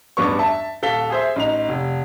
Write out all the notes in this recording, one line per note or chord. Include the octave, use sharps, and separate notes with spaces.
A1 E2 G2 B3 D4 C#6
E5 A5
D#1 A4 F5 B6 G7
G#4 C5 E5
A1 D#4 F7
F1